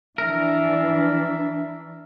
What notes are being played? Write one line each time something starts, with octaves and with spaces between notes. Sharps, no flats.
E3 D4 A#4 E5